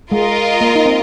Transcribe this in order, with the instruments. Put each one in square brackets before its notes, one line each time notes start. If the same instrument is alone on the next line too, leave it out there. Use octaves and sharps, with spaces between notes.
[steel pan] G#3 [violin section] F4 A#4 D#5
[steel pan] A#3
D#4
C4